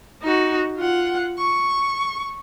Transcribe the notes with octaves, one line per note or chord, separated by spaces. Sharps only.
D#4 F#4
F4 F#5
C#6